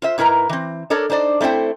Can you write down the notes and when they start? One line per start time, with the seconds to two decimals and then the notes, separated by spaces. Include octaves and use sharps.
0.02 F4 C5 E5
0.18 G#2 E4 A#4 B4 A#5
0.49 E3 C4
0.90 D4 A4 A#4 C#5 D5
1.10 D4 D#4 C5 D5
1.41 A3 C4 E4 C5 G5